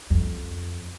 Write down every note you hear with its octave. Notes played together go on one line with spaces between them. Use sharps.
F2